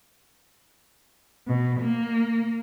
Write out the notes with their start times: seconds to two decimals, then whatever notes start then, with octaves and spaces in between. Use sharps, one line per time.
1.47 B2
1.81 A#3